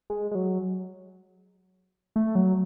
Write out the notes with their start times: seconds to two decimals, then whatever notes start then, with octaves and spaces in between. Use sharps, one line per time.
0.10 G#3
0.31 G#3
0.35 F#3
2.16 A3
2.35 F#3